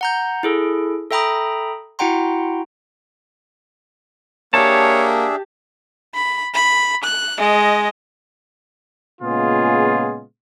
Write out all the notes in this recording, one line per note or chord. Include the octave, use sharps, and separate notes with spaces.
F#5 A#5 G6
E4 G#4 A4
A4 E5 G5 A#5 B5 D#6
E4 F#4 F#5 G5 A#5 C6
A#3 D4 G4 G#4 C#5 E5 A5
B5
B5
F#6
G#3 D#5
A#2 C#3 G#3 B3 F4 G#4